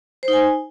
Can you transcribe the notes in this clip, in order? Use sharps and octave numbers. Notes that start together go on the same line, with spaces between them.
C5
D#4
G#5